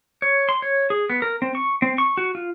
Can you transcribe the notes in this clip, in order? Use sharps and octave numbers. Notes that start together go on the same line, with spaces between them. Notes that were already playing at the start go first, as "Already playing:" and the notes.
C#5
C6
C#5
G#4
B3
A#4
C4
C#6
C4
C#6
F#4
F4